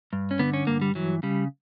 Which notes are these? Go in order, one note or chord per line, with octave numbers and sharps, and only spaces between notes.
G2
C#4
D3 B3
C#4
G2 A#3
G3
E3 F#3
C#3 G3